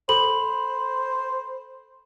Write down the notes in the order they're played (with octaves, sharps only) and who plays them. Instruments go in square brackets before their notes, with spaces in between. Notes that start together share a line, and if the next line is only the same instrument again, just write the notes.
[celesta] A4 B5 F#7 [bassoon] C5